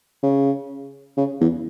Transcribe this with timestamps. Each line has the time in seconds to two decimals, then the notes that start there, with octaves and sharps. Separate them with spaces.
0.23 C#3
1.17 C#3
1.41 E2